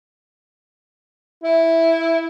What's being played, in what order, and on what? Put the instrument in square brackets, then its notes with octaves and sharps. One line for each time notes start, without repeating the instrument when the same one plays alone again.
[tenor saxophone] E4